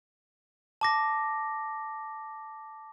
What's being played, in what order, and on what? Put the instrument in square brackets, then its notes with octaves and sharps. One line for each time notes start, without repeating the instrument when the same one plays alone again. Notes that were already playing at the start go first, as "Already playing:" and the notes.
[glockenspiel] A5 D6 A#6